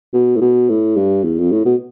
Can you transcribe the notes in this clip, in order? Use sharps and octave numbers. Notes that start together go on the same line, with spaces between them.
B2
A2
B2
A2
G2
E2
F2
A2
B2